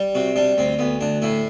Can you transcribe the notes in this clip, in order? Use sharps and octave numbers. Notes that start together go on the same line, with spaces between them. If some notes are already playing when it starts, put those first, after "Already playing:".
Already playing: G3
C3 F#4
G3 D4
D2 C4
D2 B3
D2 D4
A2 E4